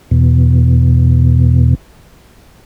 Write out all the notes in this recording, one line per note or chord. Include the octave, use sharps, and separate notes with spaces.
E2 B2